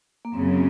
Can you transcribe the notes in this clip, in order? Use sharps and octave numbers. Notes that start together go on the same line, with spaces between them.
A#3
F#2 C#3 F#3 C4